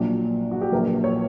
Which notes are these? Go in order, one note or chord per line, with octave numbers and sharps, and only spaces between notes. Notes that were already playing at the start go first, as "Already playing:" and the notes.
Already playing: A#1 A#2 F#3 D4
F#4
G4
A#1 A#2 F#3 A#4
C#5